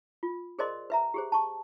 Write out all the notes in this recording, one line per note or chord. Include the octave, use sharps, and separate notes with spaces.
F4
G#4 A#4 C5 D5 D#5 C6
B4 E5 A#5
G4 G#4 C5
A5 C#6